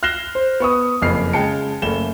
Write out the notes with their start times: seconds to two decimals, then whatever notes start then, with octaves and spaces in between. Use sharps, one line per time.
0.03 F6 F#6 A#6 C7 E7 G7
0.35 C5
0.60 B3 C#6 D#6
1.02 F#1 F2 F6 C7
1.33 C#3 G#3 G5 A5 C#7
1.82 F#1 A3 E7 G7